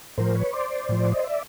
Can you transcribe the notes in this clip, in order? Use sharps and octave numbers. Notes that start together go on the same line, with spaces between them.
A2 F3 A#4 C5
B4 C#5
C5 D5
A2 F3
D#5
D5 E5